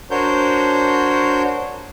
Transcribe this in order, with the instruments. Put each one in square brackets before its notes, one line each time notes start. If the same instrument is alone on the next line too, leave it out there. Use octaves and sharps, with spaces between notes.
[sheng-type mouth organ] D4 F#4 A#4 C5 C#5 G6